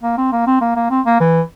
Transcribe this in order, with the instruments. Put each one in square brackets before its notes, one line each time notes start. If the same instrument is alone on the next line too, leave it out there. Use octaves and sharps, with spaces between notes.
[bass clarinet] A#3
C4
A#3
C4
A#3
A#3
C4
A#3
E3